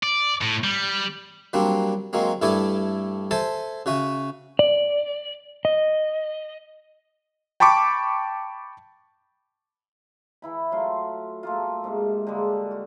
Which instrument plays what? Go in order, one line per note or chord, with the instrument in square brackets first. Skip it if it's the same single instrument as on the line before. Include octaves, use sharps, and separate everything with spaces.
[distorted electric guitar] D5
A2
G3
[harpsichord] F#3 G3 A#3 C4 D4
F#3 G#3 A#3 C4
G2 A3 E4 A4 D5 G#5
A4 C5 E5 G#5 A5
C#3 F#4 E5 D#6
[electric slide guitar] D5
D#5
[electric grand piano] G5 A5 B5 C#6 D6
[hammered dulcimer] E3 E4 B5
F#3 A3 F4 C6
A3 A#3 F4
G#2 C3 A#3
D3 G3 G#3 A#3
F#4